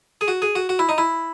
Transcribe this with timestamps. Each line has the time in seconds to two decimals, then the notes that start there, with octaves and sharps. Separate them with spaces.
0.21 G#4
0.28 F#4
0.42 G#4
0.55 F#4
0.69 F#4
0.79 E4
0.89 D#4
0.98 E4